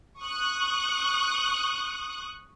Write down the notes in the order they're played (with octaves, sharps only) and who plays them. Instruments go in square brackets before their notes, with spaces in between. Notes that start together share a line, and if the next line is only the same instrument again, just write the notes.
[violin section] C#6 D#6 F#6